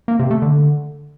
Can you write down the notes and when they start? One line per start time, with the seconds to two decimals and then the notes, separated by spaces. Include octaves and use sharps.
0.08 A#3
0.19 C3
0.31 A3
0.42 D3